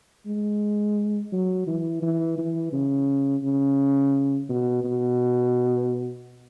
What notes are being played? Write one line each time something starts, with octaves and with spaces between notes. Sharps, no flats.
G#3
F#3
E3
E3
E3
C#3
C#3
B2
B2